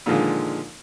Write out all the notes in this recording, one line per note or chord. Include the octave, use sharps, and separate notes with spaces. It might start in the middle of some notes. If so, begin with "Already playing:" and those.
A#2 D3 D#3 F3 G#3